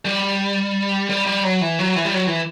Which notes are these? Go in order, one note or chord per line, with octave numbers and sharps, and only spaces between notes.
G3
G3
G3
F#3
E3
F#3
E3
G3
F#3
E3